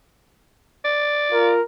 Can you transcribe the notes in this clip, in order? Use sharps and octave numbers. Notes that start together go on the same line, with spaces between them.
D5
F4 A#4